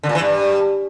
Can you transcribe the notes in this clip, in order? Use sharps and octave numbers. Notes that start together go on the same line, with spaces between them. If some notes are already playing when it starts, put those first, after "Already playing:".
D3
A#2
E3
G2